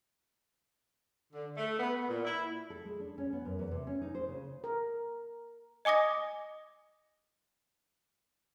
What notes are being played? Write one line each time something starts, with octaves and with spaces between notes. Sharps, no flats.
D3
A3
B3
B3
A#2
E4
A4
G#3
D4
C#4
B3
F#2
E2
C3
C#4
D#4
C5
C#3
A#4
D#5 G#5 D6 D#6 A#6